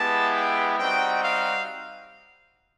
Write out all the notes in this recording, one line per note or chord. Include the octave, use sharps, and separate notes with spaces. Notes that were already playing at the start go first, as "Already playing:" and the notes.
Already playing: G#3 B3 E4 G4 A5
G5
G3 C4 D#4 F#4 G5
F5